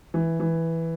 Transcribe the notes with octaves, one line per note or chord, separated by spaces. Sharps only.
E3
E3